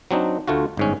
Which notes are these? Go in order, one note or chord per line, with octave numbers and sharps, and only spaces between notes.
F#3 C4 D4 D#4
D2 A3 F4 F#4
G1 G#2 C#4